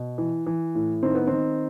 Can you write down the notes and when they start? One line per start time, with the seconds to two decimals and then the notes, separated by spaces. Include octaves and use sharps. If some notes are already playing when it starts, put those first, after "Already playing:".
Already playing: B2
0.18 E3
0.46 E3
0.75 A2
1.03 D#3 C4
1.15 B3
1.27 D#3 C4